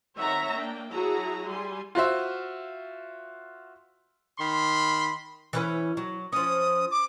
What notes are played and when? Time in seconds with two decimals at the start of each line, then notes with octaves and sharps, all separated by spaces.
0.17 D#3 C4 C#5 E5 F#5 A#5
0.54 A#3 D4 G5
0.93 F#3 E4 F#4 G#4 A5 A#5
1.46 G3 G#5 C6
1.95 F4 F#4 C5 E5
4.39 D#3 B5 C6
5.53 E3 C#4 B4
5.97 F#3
6.32 F3 C#4 D#6
6.91 D6